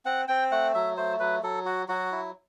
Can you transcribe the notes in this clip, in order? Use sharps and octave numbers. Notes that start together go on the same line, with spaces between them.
C4 F#5
C4 G5
A3 F#5
F#3 E5
A3 C5
F#3 B4
F#3 A4
F#4
F#3 F#4
E4